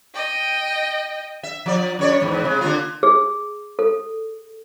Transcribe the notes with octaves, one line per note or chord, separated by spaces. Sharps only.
D#5 G5
E5
F3 D5
F#2 C#5 D5
E2 G#2
C3 G#3
D3 A#3 F4
G#4
A4